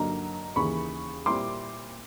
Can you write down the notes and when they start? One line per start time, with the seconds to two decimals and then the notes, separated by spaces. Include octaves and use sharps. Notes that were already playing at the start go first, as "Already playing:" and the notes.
Already playing: G2 D3 F#3 A#3 D#4 A#5
0.56 D#2 C#3 E3 B5 C#6
1.26 A#2 G3 C4 E4 C6 D6